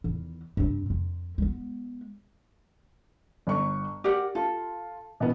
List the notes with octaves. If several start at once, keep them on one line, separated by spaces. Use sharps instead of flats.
E2 D#3
G2 C4
F2
G#3 B3
G1 C#6
G4 A#4 D5 F#5
F4 A4
B2 E3 B3